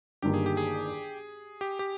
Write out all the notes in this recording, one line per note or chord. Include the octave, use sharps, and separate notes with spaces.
G1 G2 D#3 A#3 G4
G#4
G4
G#4
G4
G4